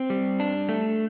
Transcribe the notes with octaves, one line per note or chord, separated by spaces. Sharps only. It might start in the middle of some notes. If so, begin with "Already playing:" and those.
Already playing: C4
G3
D4
A3